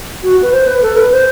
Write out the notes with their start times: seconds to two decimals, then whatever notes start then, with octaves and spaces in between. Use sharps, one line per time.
0.23 F#4
0.42 B4
0.52 C5
0.67 B4
0.82 A4
0.96 B4
1.12 C5